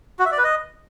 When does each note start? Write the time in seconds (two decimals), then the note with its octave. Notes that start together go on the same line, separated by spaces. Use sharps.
0.19 F#4
0.26 E5
0.32 D5
0.38 B4
0.44 D#5